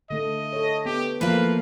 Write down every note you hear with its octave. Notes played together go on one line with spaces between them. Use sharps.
D3 A3 A4 D#5
A4 C#5
B3 G4
F3 A3 A#3 F4 B4 F5